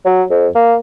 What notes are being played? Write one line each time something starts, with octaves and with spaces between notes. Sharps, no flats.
F#3
F2
A#3